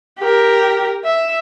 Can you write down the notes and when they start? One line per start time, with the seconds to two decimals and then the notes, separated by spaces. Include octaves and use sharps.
0.19 G4 A#4
1.04 E5